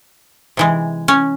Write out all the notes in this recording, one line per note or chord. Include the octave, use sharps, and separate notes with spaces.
C3 E3 G#3
C#4